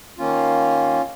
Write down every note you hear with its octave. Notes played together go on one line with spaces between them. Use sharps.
D#3 A#3 C#4 F4